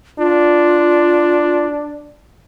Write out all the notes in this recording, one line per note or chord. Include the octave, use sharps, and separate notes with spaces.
D4 F4